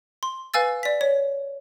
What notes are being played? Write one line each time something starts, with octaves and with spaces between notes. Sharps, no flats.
C6
B4 F5 G#5 E6 A6
D5 B6
C#5